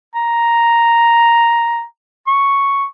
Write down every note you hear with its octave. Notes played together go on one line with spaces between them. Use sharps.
A#5
C#6